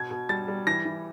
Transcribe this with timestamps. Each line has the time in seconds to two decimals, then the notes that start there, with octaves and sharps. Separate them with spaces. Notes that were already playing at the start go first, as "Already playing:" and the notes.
Already playing: B2 G#6
0.11 B2
0.29 G3 A6
0.48 G3
0.67 E3 A#6
0.85 E3